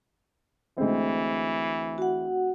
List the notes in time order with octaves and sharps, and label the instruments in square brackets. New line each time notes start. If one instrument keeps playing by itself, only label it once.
[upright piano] D2 G#3 C4 [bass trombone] E3
[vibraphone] F#4 F#5